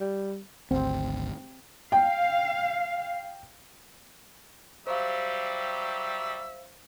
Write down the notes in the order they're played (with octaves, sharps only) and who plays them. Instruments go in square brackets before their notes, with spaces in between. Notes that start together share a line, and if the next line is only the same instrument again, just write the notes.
[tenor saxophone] G3
[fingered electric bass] G#1 D2 [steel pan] C4
[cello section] F5 [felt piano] G5
[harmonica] F#3 G3 G4 [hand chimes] C5 F5 [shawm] E5